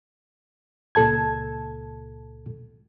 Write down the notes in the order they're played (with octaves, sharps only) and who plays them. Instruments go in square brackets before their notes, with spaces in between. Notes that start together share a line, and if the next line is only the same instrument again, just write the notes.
[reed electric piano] C#2 A#2 A4 A5 G#6